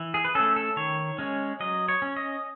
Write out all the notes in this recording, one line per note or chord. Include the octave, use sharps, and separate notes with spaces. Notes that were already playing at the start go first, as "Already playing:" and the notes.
Already playing: E3
G#4
B4
A3 C#4 A4
A4
D#3 C#5
G#3 C#4
F#3 D#5
C#5
C#4
D#5